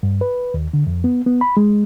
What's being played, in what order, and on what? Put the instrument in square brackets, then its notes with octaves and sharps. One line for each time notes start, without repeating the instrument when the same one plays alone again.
[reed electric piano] G2
B4
D#2
D3
F2
B3
B3
B5
G#3